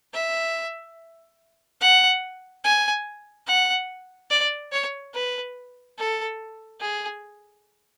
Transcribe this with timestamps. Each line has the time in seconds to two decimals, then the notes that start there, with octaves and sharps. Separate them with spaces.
0.14 E5
1.81 F#5
2.64 G#5
3.47 F#5
4.30 D5
4.72 C#5
5.14 B4
5.98 A4
6.81 G#4